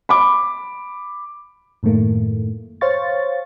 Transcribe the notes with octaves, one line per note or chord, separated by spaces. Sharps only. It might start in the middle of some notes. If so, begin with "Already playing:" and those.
B5 D6
F#2 A2 D#3 A3 A#3
C5 C#5 F5 C#6 A6